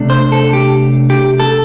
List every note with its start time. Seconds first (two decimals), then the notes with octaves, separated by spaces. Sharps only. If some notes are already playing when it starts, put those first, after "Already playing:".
Already playing: C3 A3 D4
0.10 C5
0.32 A4
0.53 G4
1.10 G4
1.40 A4